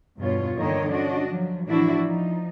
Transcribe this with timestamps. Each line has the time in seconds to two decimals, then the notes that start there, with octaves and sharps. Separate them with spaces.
0.18 E2 G2 B2 B3 F4 C#5
0.56 G2 D3 D#3 A#3 C#5 D#5
0.91 C#4 D4 F#4 D#5
1.29 F3 F#3
1.67 A2 E3 F3 D4 E4 F#4
2.05 F3 D#4